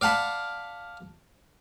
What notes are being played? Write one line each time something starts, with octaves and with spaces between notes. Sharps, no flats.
D5 F5 F#5 A5 B5